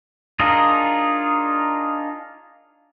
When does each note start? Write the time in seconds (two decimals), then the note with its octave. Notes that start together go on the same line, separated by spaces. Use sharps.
0.40 D4 D#4 F4 G#4 A#4